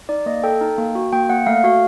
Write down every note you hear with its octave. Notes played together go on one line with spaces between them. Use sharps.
D#4 D5
A#3 D#5
A4 G5
D#4
A#3
F#4
A#3 G5
A#3 F#5
A3 F5
F#4 F5